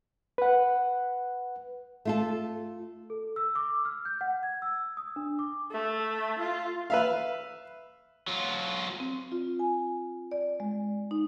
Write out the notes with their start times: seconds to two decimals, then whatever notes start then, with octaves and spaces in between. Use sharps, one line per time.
0.38 B4 F#5
2.05 A3 F4 A4
3.10 A4
3.36 E6
3.55 D6
3.85 F6
4.05 G6
4.21 F#5
4.43 G#6
4.62 E6
4.97 D#6
5.16 D4
5.39 D6
5.71 A3
6.39 F4
6.90 B4 E5 F5
8.28 F#3 F4
9.00 C4
9.32 F4
9.59 G#5
10.32 D5
10.60 G#3
11.11 D#4